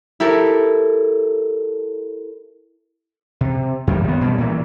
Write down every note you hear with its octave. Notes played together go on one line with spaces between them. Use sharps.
E4 G4 A4 A#4
C3
F#2 E3 G3
D#3 B3
B2 G3
A#2 E3